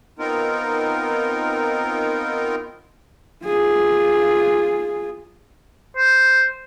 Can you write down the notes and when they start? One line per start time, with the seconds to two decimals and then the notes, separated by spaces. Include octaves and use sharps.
0.19 B3 C4 D#4 F4 A#4
3.44 F4 G#4
5.97 C5